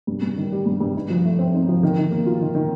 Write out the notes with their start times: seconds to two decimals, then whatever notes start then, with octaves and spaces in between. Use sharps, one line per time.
0.07 G2
0.22 G2
0.37 D#3
0.52 G3
0.66 G2
0.80 G2
0.95 D#4
1.10 F3
1.25 A3
1.39 C4
1.54 D#4
1.68 F3
1.83 D#3
1.97 D#3
2.11 A#3
2.26 F4
2.41 D#3
2.55 D#3